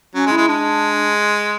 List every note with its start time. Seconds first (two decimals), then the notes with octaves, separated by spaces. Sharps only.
0.15 F#3 C#4
0.26 G#3
0.31 E4
0.37 G#3
0.48 G#3 D4